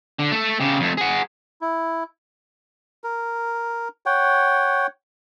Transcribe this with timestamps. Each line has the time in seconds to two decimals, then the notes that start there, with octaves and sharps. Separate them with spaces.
0.19 D3
0.32 A3 A4
0.60 C#3 G4
0.80 F2 A3
0.97 G#4 F#5
1.61 E4
3.04 A#4
4.06 C#5 F#5 G5